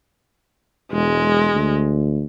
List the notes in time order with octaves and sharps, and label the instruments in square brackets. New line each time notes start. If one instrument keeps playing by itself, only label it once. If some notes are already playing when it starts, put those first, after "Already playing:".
[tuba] E1 [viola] G#3
[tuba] D2